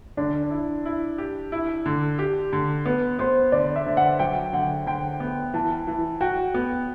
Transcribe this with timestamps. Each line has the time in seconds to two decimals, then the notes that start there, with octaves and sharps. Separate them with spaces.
0.17 D3 D4
0.51 E4
0.85 E4
1.18 G4
1.52 E4
1.86 D3
2.19 G4
2.52 D3
2.86 B3 B4
3.19 B3 C5
3.52 D3 D5
3.76 E5
3.86 D3
3.97 F#5
4.19 F#3 G5
4.53 D3 F#5
4.86 D3 G5
5.20 B3
5.54 E3 A5
5.87 E3
6.21 F#4 G5
6.54 B3